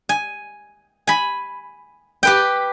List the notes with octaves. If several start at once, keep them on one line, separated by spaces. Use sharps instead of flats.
G#5
G#5 B5
G4 B4 G5